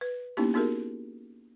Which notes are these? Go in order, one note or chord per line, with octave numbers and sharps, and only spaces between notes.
B4
A#3 B3 C#4 D#4 E4 G4
B3 D#4 F#4 G#4 A#4